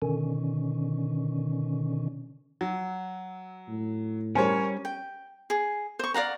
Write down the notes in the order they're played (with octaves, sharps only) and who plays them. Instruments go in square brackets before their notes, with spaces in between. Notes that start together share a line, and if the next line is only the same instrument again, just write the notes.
[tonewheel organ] B2 D3 D#3 C#4
[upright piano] F#3
[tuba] A2
[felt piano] G3 G#5 [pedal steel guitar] C#4 [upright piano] A#4 C5 C#5
[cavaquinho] G5
G#4
C5 C#6
D5 F5 F#5 A#5